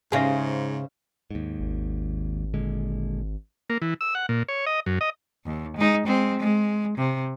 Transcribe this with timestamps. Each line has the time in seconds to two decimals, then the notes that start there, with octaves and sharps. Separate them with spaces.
0.12 G#2 C#3 C#4 G#4 C5 E5 F5 G#5
1.31 D#2 G#2
1.60 G#1
2.54 A#2 D3 G#3
3.70 A#3
3.82 E3
4.01 E6
4.15 F#5
4.29 A#2
4.49 C#5
4.66 D#5
4.86 F#2
5.01 D#5
5.45 D#2
5.77 G#3 D#4
6.05 G#3 C4
6.40 G#3
6.98 C3